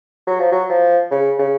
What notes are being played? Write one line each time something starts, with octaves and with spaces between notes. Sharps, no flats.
F#3
F3
F#3
F3
C#3
C#3